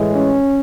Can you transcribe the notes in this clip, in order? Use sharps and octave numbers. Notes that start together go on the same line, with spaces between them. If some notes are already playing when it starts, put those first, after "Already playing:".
Already playing: A2 E3 G#3
C#4